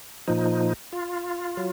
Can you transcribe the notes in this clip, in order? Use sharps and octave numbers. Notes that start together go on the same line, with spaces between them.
A#2 F3 D#4
F4
F#3